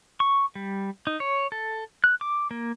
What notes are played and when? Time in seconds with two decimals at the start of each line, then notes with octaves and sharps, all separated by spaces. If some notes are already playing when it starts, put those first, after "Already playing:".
0.20 C#6
0.55 G3
1.07 D#4
1.20 C#5
1.52 A4
2.04 F#6
2.21 D6
2.51 A#3